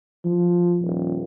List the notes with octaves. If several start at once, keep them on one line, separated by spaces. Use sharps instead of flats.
F3
D#1